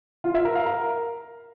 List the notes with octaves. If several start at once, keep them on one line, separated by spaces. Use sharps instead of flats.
F4
E5
A#4
F5
A#4